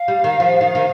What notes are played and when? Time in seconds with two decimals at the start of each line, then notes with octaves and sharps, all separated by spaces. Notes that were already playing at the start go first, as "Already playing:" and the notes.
Already playing: F5
0.08 G3
0.24 D#3
0.40 F3
0.61 D#3
0.75 D#3